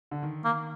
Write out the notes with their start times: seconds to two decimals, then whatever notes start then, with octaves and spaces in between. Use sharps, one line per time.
0.11 D3
0.23 D#3
0.45 A#3